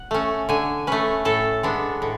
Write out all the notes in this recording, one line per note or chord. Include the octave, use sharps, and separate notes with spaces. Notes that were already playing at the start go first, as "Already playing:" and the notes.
Already playing: F#5
A3 C#4
D3 G#5
A3 C#4 B4
A2 A4
G#3 B3 D4
A2